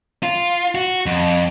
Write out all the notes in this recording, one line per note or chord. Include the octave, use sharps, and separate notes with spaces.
F4
F#4
F2